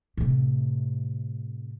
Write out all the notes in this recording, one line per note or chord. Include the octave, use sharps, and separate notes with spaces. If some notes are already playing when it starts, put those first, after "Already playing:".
A2 C3